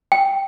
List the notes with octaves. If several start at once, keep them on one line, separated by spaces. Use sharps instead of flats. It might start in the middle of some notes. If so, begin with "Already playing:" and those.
G5